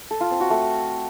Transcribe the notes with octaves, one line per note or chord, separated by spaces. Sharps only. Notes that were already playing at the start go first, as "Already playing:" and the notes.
A4
F4
C4
F#4
A3